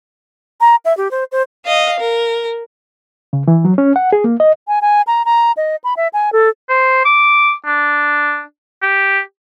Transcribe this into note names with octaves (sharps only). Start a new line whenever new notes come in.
A#5
E5
G4
C5
C5
D#5 F5
A#4
C#3
E3
F#3
C#4
F#5
G#4
A#3
D#5
G#5
G#5
A#5
A#5
D#5
B5
E5
G#5
A4
C5
D6
D4
G4